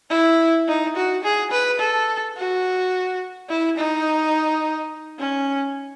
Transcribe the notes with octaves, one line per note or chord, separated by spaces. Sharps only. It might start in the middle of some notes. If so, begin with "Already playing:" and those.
E4
D#4
F#4
G#4
B4
A4
F#4
E4
D#4
C#4